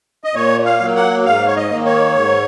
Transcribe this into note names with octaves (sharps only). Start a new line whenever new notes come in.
D#5
A#2 C#5
F5
F#3 A#3
F#5
G#2 F5
C#5
D#5
D#3 A#3
C#5
G#2